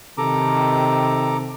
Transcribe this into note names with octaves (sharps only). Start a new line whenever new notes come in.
C3 D#3 A4 A#5 D6